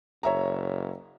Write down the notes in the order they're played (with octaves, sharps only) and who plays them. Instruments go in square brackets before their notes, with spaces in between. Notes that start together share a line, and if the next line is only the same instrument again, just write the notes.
[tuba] F#1 [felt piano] C#5 E5 A#5